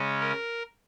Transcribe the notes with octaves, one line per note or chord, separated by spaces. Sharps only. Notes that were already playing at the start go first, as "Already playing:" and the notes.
Already playing: C#3 G#3 C#4
A#4